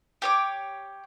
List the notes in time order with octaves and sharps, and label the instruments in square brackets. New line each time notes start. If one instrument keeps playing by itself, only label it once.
[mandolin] G4 C#5 D6